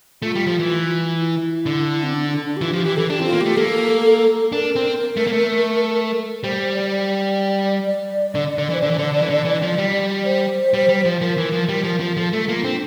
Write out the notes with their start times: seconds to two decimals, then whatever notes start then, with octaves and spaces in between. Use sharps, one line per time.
0.22 A3 F4
0.35 G3
0.46 F3
0.59 E3
1.18 E4
1.66 D3
2.03 C4
2.14 D4
2.30 D4
2.46 D4
2.57 G4
2.61 E3 F4
2.73 F3 G4
2.85 E3 G4
2.97 E3 A4
3.10 D4 G4
3.19 C4 E4
3.25 F4
3.33 A#3
3.41 A3 G4
3.57 A#3 A4
4.52 D4 A#4
4.76 C4
5.17 A3
5.27 A#3
5.33 A3
6.44 G3 C5
6.60 C5
6.75 D5
6.91 D5
7.87 D5
8.35 D3
8.58 D3
8.70 E3
8.74 C5
8.82 D3 D5
8.91 E3
8.98 D3
9.13 D3
9.22 E3
9.30 D3
9.45 E3
9.62 F3
9.78 G3
10.25 C5
10.74 G3
10.89 G3
11.05 F3
11.21 F3 A#4
11.37 E3
11.52 F3
11.69 G3
11.84 F3
12.00 F3
12.16 F3 A4
12.32 A3 A4
12.48 A#3 F4
12.64 C4 D4